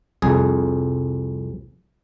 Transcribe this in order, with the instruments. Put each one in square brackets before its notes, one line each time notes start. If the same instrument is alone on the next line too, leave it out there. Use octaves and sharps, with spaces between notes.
[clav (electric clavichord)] C2 F2 G#4